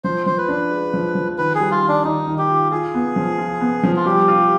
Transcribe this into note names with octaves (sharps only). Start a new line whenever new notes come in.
F3 C5
F3 C5
B4
D4
G#3
F3
F3
D#3 B4
G3 G#4
F4
D#3
D4
D#3 D#4
D#3
G4
F4
F4 G#4
B3
F3
F4
B3
F3
F4
G3 G4
F4